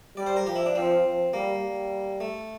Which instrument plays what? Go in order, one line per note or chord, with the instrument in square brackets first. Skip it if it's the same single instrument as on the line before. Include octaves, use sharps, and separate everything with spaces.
[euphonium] G3 [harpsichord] D5
[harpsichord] C5
A#4
[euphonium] F3 [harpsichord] G4
[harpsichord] E4
D4
[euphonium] F3 [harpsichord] C4
[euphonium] F3
[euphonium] G3 [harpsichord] A#3
[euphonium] G3
[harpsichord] A3